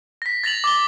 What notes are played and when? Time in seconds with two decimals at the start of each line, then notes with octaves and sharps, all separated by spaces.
0.22 A#6 B6
0.44 A6 A#6 F7 F#7
0.64 D6 A6 G7